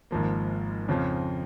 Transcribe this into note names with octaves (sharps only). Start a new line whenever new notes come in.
G#1 G#2 F3 A#3
F2 C#3 F3